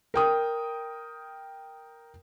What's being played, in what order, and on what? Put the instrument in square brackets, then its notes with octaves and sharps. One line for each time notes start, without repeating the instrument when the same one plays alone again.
[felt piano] A#4 G5 D#6